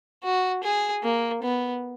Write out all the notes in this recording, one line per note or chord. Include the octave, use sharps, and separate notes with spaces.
F#4
G#4
A#3
B3